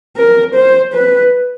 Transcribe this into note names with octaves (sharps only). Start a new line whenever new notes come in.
A#4
C5
B4